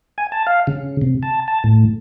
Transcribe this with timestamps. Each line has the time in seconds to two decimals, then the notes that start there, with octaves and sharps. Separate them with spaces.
0.18 G#5
0.32 A5
0.47 F5
0.67 C#3
1.02 C3
1.23 A5
1.48 A5
1.64 A2